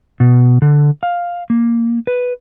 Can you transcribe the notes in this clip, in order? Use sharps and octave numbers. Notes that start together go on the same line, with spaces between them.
B2
D3
F5
A#3
B4